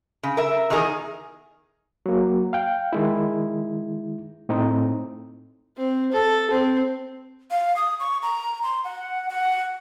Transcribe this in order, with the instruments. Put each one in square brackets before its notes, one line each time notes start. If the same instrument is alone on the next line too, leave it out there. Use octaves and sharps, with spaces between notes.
[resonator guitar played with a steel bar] C#3
A#4 E5
E2 D#3 D#4 G#4 A#4
[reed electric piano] F#3 A#3
F5 G5
D#3 G#3 E4
A2 C4 D#4
[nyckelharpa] C4
A4
C4
[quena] F5
D#6
C#6
A#5
C6
F#5
F#5